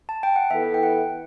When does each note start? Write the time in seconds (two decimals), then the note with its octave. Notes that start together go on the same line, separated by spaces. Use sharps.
0.09 A5
0.23 G5
0.36 F#5
0.50 E3 B3 E4 A4 E5
0.74 G5
0.83 F#5